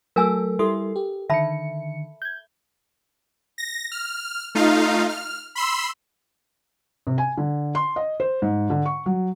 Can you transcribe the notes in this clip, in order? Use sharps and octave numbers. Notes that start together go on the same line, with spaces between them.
F#3 A3 A4 A#4 G#5 E6
G3 E4 A4 C6
G4
D3 D#3 E5 A5 B5 C#7
G6 G#6
A#6
F6
A3 D#4 F4 F5
F6
B5 C6 E6
C3
G#5
D3
C6
D#5
C5
G#2
D3
C#6
F#3